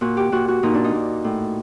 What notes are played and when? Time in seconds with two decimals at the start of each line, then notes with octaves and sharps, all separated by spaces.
0.01 A#2 F#4
0.17 G4
0.32 A#2 F#4
0.48 F#4
0.63 A#2 D#4
0.74 D4
0.84 D#4
0.95 A#2
1.24 A2